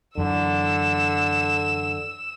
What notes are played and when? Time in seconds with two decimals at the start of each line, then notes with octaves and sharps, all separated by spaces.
0.18 F#2 D3 E3 E6 E7